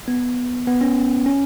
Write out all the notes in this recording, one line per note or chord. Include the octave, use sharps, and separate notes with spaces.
B3
B3
C#4
C#4